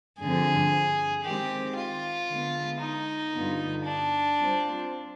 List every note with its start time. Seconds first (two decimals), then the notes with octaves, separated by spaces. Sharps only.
0.19 G2 D3 F3 C4 G#4
1.24 D#3 G#3 C4 G4
1.76 F4
2.29 D3 G#3 B3
2.81 D#4
3.33 G2 D3 G3 B3 F4
3.85 D4
4.38 G3 C4 F4 C5